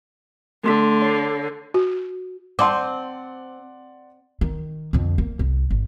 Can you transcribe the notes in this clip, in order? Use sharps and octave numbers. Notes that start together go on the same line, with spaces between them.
D3 A3 C6 B6
C#5 C7
F#4
C4 D5 F#5 A5 C6 D6
D#3
F2 D3
A#3
C2
G#1